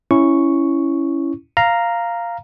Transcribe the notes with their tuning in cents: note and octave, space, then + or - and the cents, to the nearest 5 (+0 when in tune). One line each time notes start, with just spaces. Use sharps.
C#4 +0 E4 +0 C#6 +0
F5 -5 A#5 +0